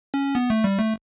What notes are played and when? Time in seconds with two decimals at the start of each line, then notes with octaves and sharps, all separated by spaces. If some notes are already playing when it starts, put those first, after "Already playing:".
0.14 C#4
0.35 B3
0.50 A3
0.64 G3
0.79 A3